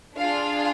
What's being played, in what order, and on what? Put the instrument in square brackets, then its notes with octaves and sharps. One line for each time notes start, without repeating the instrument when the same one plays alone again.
[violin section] D4 F4 G#4 F5